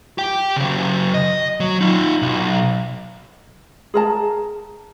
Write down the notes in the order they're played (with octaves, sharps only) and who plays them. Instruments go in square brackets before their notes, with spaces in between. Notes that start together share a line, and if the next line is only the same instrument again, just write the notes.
[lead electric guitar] G4 G5
C#3 F#3
D#5
F#3
D#4 F4
B1
[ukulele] G#4 A#4 A5